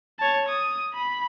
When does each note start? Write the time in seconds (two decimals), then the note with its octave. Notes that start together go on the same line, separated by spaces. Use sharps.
0.19 C#5 A5
0.48 D#6
0.94 B5